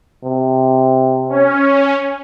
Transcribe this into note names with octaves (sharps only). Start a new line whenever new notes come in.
C3
C#4